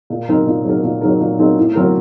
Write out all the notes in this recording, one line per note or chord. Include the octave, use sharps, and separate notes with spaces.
A#2
F#3 C4 D#4 A#4
A#2
F#3 C4 D#4 A#4
A#2
F#3 C4 D#4 A#4
A#2
F#3 C4 D#4 A#4
A2
F#3 C4 F#4 A#4